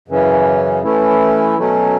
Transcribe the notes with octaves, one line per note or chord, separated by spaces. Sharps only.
F#2 C#3 E3 C#4
E3 A3 C#4 E4
B2 F#3 A3 C#4